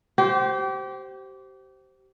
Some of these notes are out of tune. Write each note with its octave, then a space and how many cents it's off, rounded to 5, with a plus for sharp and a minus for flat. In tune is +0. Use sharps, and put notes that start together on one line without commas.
G4 -30 C5 +0